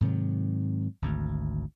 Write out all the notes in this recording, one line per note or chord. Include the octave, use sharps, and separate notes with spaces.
G#2 C3 D#3 F#3
G#1 D2